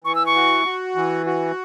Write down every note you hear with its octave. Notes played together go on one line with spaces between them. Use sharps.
E3 C#6
E6
C#6
F#4
F#4
E3
F#4